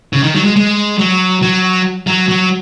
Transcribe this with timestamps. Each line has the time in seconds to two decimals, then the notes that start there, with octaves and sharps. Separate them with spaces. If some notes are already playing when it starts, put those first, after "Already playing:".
0.13 C#3
0.23 D#3
0.35 F#3
0.44 G#3
0.56 G#3
0.98 F#3
1.42 F#3
2.07 F#3
2.28 F#3